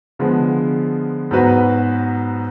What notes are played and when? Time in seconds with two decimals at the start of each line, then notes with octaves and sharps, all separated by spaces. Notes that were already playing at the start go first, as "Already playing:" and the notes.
0.19 D3 F3 G#3 B3
1.31 G#2 F#3 B3 F#4 B4